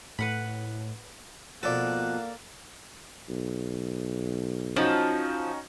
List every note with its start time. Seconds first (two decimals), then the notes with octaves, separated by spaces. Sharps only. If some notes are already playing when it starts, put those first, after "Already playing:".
0.19 A2 B4 F#5 B5
1.63 B2 F3 A#3 A4 D5 F#5
3.29 B1
4.76 F3 C#4 D#4 F#4